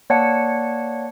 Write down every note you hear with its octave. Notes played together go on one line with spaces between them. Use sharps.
A#3 C#5 D5 F#5 A5 C#7